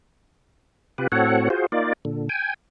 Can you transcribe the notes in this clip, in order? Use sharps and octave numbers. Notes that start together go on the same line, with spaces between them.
C3 F4 G4 B4
A2 C4 F#4 A4 C#5 F#5
F4 F#4 G#4 C5
A#3 D#4 F4 D5
A#2 D3
G5 G#5